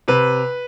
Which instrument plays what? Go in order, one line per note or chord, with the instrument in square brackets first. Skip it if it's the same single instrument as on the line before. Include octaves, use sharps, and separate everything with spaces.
[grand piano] C3 B4